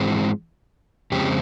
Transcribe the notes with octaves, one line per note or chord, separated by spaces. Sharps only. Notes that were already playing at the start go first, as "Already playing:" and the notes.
Already playing: G#2 E3 G#3 C4
F2 C#3 G#3 C4 G4